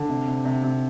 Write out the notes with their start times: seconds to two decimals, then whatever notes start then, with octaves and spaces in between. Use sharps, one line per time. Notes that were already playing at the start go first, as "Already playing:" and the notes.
Already playing: D3
0.09 C3
0.27 C3
0.45 C3
0.63 C3